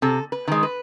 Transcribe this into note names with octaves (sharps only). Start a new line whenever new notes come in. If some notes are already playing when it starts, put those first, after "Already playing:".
C3 A4
B4
D#3 G#3
B4